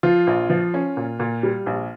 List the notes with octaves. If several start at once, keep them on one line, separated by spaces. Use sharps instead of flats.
F3 F4
A#1
F3
C#4
A#2
A#2
G3
A#1